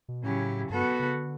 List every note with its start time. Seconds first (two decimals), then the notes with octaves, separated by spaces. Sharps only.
0.08 B2
0.23 A2 C#3 F#3 C#4 E4 G4
0.70 G2 B3 F#4 A4
1.00 C#3
1.15 D3